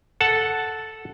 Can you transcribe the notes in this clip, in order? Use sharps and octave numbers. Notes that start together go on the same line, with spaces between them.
A4 F#5 A5